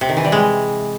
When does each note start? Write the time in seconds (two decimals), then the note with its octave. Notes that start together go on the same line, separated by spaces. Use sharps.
0.01 C3
0.09 D#3
0.17 E3
0.24 G3
0.32 G#3